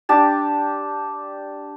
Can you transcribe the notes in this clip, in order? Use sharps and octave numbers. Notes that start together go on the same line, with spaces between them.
D4 G4 A5